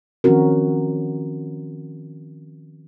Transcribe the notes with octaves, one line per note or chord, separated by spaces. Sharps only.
D#3 F3 C4 C#4 F#4 A#4